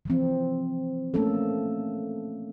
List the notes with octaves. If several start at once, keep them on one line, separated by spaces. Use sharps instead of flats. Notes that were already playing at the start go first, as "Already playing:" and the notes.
E3 F3 C4
A3 A#3 C#4 A4